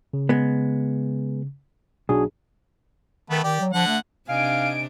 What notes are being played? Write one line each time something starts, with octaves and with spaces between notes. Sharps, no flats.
C#3
G#3 B3
B1 D4 F#4 G#4
D#3 A3 B3
D#3 G4 D5
F#3
D3 F3 F#5
A3
C3 D4 D#4 D#5 F5 G#5 D7